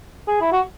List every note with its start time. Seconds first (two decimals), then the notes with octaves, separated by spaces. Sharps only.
0.28 G#4
0.41 E4
0.52 F#4